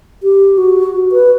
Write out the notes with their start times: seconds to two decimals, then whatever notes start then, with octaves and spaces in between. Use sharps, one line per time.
0.23 G4
0.58 F#4
1.12 B4